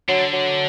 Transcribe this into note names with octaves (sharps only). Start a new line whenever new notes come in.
D3 F#3
F#3